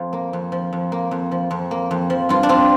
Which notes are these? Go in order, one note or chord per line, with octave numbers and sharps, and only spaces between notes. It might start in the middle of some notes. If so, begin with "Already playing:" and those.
Already playing: F2 F3
A#3
F2
F3
F2
A#3
F2
F3
F2
A#3
F2
F3
G2 F4
D4
C4 F4